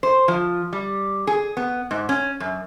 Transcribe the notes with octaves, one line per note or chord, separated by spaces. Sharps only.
C5
F3
G3
G#4
B3
G#2
C#4
F#2